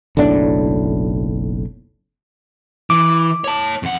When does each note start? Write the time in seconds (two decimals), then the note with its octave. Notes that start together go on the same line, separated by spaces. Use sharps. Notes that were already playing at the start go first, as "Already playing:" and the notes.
0.17 F#1 B1 A2 D4
2.90 E3 D6
3.44 C#5 A5
3.83 F2 F#5